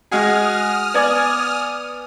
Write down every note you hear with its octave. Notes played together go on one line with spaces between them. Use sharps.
G#3 F#4 G#4 D#6 F6
B3 D5 G#5